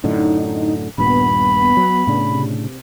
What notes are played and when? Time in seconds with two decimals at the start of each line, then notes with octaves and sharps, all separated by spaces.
0.04 F#2 A2 D3 D#4
0.98 D#1 G2 A#2 B3 B5
1.77 F#3
2.07 A2 C#3 D4
2.31 C3